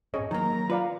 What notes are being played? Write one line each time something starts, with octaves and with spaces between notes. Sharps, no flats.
G#2 C4 C#4 G#4 C#5 D#5
D#3 F#3 A#3 A#5
F4 B4 D5 F5